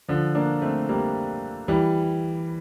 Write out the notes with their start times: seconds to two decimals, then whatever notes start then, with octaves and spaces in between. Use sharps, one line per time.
0.08 D3 F3
0.35 A#3 D4
0.62 A3 C4
0.89 G3 A#3
1.68 E3 G3